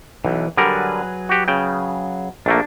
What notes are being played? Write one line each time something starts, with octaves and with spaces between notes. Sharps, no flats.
B1 E3
D3 F#3 G3 G#4 A#4 B4
F#4 G4
C#3 G5
A#1 A3 A#3 D4